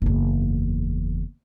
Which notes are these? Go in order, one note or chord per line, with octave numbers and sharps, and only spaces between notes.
F#1 E2